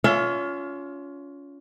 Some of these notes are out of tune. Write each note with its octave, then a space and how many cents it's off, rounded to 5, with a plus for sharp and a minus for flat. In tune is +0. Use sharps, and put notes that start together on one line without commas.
C#4 +30 F4 +10 E5 +30